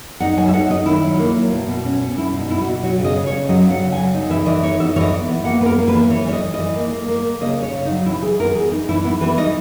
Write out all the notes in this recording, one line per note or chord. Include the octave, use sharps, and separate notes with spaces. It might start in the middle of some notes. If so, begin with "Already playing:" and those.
D#4 F#5
F#3 G#5
E5
D#4 F#5
D#4 D#5
D#3 E4
F#3
A#3
F#3
B2
B2
C#4
C#4
B2 E4
B2
D#4
B2 E4
F#4
B2
F#3 F#4
C#3
D#5
C#3
C#5
C#4
F#3 D#5
C#3
F#5
C#3
G#5
F#3
D#4
E3 E5
E3 D#5
D#4 C#5
B3 E5
E3 C#5 D#5
E3
B3
A#3 F#5
A#3 B4
A#4
A#3
B4
E3
E3 C#5
E3 C#5
D#5
E3
D#5
E3
A#3
A#3
A#3
A#3
C#3 D#5
C#4 C#5
C#3
D#4
F#3
E3 E4
E3 G#4
B3 A#4
E3 G#4
D#4
E3 E4
B3 E4
E3 B4
D#4 D#5